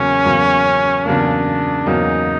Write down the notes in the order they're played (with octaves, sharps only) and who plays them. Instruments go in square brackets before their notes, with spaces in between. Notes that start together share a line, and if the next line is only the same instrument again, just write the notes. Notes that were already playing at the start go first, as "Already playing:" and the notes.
Already playing: [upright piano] E2 C#3 F#3 A#3 [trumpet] C#4
[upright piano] E2 C#3 F#3 A#3
[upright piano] E2 C#3 F#3 A#3 [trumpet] D4
[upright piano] E2 C#3 F#3 A#3 [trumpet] D#4